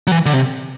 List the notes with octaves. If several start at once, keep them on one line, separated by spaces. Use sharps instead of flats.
F#3
E3
D3
C3